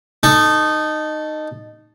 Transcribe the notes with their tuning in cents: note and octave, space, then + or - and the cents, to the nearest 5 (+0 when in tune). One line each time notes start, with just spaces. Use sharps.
D#4 -15 A4 +0 C#6 +0